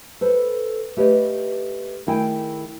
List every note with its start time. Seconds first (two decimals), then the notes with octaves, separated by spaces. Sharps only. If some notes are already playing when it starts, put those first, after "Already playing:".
0.21 A4 B4 C5
0.97 A3 G4 B4 C#5 D#5
2.07 D#3 A3 E4 G#4 G5 G#5